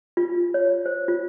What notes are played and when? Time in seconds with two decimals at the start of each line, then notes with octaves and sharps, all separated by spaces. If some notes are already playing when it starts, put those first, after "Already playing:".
0.17 F4
0.54 C#5
0.86 C5
1.08 F4